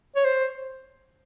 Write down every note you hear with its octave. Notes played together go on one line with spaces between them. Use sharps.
C#5
C5